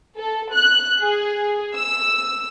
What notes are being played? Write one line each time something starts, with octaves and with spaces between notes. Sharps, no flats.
A4
F#6
G#4
E6